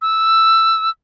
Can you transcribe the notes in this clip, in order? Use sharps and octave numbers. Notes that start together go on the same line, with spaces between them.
E6